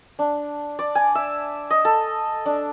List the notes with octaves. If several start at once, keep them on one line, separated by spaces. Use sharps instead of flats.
D4
D5
G#5
E5
D#5
A4
D4